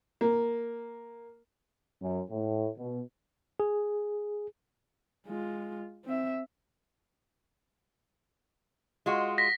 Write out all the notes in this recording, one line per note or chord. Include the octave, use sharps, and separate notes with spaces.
A#3
F#2
A2
B2
G#4
G#3 F4
C4 E5
G#3 F4 F#4
A#6 B6